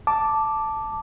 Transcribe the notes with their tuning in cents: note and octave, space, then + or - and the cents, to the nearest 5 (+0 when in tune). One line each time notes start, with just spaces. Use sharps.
A5 +0 D6 +0